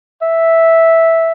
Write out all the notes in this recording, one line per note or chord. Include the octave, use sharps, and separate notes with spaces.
E5